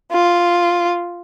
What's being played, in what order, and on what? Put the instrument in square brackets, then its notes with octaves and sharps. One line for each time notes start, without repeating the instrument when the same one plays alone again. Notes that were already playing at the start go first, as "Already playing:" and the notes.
[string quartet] F4